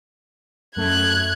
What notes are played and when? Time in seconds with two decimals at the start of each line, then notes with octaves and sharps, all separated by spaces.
0.76 F#2 A3 F#6 G#6